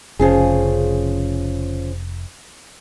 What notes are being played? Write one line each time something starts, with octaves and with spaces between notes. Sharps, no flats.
F1 C#3 F3 C#4 G#4